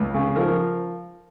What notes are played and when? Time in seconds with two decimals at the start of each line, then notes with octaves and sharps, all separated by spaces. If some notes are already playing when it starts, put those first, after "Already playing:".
Already playing: C#2
0.14 C#3
0.36 F3 A#4